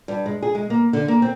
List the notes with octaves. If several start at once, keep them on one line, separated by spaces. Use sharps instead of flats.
G2
G#3
G#4
G#3
A#3
D3
A#3
C4